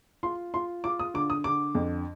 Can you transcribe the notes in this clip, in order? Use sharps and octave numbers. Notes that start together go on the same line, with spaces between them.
F4 C6
F4 C6
F4 D6
D#6
D3 D6
D#6
D3 D6
F2